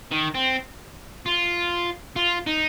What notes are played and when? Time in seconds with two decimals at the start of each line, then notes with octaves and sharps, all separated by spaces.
0.12 D#3
0.35 C4
1.26 F4
2.16 F4
2.46 D#4